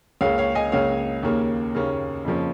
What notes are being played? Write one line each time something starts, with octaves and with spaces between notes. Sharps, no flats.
C#2 C#3 A#3 C#5 F5
C#5 F5
D#5 G#5
C#2 C#3 A#3 C#5 F5
D#2 C#3 A#3 C#4
D#2 C#3 A#3 C#4
F2 C#3 F3 A#3 C#4